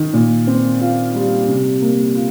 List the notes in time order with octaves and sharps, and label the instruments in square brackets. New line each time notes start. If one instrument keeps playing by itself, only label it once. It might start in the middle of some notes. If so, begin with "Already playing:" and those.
Already playing: [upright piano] D#3
A#2
C4
F4
G3
C3
A#3
F4